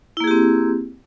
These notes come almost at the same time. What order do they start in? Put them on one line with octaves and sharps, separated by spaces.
E4 A#3 G#4 G4 C4